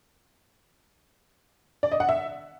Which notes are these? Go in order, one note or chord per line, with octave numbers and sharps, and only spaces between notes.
D5
D#5
F#5
E5